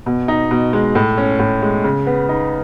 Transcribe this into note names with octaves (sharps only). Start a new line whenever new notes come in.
B2
D#4
B2
G#3
A2
C#4
A2
G#3
C#3
B3
D#4